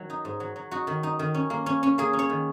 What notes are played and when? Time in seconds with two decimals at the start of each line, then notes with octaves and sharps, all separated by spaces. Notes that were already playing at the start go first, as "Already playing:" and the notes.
Already playing: D#3 F#3
0.10 D#4
0.25 G#2
0.40 F#3
0.56 F#3
0.71 D#4 F#4
0.87 D#3
1.03 D#4
1.19 D#3
1.34 C#4
1.50 A#3
1.66 C#4
1.83 C#4
1.98 A#3 G#4
2.13 C#4
2.19 C#5
2.30 D#3